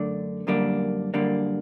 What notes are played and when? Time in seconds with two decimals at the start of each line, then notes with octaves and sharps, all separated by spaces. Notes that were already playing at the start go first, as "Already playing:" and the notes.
Already playing: F#2 D3 A3 D4
0.47 F#2 D3 G3 A#3 D4
1.14 F#2 D3 G3 A#3 D4